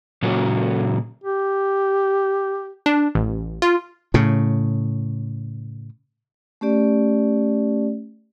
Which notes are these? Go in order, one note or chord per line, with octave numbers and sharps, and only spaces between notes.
A#2 C#3 F#3 C#4 F#4
G4
D4
A1
F4
A2 C#3
A3 C#4 G4 D5